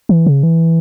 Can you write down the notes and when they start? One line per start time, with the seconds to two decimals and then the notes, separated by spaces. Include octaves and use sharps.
0.09 E3
0.27 C#3
0.43 E3